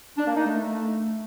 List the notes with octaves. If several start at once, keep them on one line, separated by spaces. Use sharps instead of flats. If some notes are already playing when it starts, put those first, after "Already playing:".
D4
A#3
D#4
A3